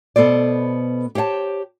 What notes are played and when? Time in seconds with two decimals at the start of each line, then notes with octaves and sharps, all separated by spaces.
0.16 B2 B3 A4 C5 D5
1.15 G4 C5 C#5 F#5 A5